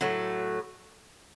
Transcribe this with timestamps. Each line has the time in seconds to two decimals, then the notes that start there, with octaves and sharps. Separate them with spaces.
0.01 A2 F#3 A3